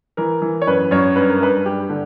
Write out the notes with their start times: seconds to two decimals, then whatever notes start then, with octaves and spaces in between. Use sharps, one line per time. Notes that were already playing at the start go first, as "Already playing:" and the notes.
0.17 E3 A#4
0.42 E3
0.62 C#5
0.67 F#2 B4
0.91 F#2 C#5
1.16 G2 B4
1.30 A#4
1.41 G2 B4
1.65 G2 G4
1.90 D3